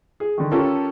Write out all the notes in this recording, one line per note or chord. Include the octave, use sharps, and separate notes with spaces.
G#4
D3 D#3
C#4 F4 G4 A4 A#4